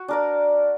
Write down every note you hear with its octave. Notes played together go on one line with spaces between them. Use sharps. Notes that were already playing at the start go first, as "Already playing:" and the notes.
Already playing: F#4
D4 A#4 D5